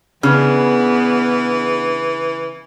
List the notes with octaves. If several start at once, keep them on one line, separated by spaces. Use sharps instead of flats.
C#3 E3 B3 D4 G#4